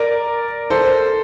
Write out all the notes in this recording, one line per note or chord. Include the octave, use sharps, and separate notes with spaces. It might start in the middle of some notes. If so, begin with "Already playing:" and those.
Already playing: A#4 D5
A4 C5